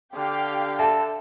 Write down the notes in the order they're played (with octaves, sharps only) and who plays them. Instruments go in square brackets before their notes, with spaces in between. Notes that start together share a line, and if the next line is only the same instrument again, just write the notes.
[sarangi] D3 [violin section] G4 F5
[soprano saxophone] A4 [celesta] E5 A5